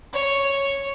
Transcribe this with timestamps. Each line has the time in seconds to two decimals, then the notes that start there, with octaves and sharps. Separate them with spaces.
0.13 C#5